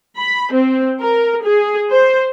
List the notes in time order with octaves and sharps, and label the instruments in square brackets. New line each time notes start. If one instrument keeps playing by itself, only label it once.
[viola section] B5
C4
A#4
G#4
C5